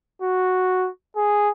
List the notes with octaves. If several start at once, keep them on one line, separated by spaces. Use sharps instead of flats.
F#4
G#4